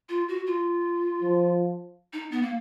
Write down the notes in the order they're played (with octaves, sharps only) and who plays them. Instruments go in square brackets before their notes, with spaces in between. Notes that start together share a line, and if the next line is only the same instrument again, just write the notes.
[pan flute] F4
F#4
F4
[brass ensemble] F3
[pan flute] D#4
B3
A#3